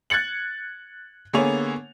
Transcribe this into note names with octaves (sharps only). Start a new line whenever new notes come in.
F#6 G#6 A6 C#7 F#7
D3 A#3 B3 G#4 C#5 F7